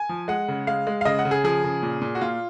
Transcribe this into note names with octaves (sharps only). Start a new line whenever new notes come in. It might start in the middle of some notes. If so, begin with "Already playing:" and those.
Already playing: G#5
F3
G#3 F#5
C#3
G#3 F5
G#3
F5
C#3 D#5
F#5
C#3
G#4
F3 G#4
C#3
A#2
A#2
F#4
A#2 F4